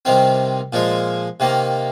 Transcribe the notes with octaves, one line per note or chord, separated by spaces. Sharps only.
C2 C3 D#3 C4
A#2 F3 G#3
C3 D#3 A#3